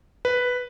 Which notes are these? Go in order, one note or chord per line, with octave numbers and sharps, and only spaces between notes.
B4